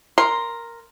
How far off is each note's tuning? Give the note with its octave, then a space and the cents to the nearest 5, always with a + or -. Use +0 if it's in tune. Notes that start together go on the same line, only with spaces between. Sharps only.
A#4 +0 C6 +0